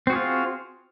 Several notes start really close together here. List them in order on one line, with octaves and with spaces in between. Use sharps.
C4 F#4 G#4 F4